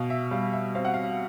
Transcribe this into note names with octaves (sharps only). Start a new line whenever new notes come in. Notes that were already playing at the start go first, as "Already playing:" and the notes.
Already playing: B2 F5
E5
G3 F5
E5
C4 F5
F#5
F5